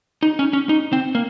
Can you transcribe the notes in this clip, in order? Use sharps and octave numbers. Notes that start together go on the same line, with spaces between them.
D#4
C#4
C#4
D#4
C4
A#3